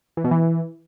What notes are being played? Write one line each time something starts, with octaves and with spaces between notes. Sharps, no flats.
E3
B2
E3